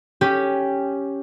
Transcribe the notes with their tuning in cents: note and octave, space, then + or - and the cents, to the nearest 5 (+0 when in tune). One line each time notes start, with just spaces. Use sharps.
C#4 +0 G4 +0